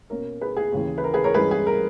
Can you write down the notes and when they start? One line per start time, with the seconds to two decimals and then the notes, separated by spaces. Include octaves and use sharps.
0.10 B2 A#3 C#4 A#4
0.41 G#4 B4
0.57 G#4
0.72 D#2 C#3 E3
0.98 B4
1.04 A#4
1.14 G#4 B4
1.24 A#4 C#5
1.34 G2 E3 G#3 C#4 G#4 B4
1.51 G#4
1.67 A#4